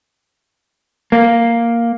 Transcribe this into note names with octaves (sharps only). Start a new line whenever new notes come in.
A#3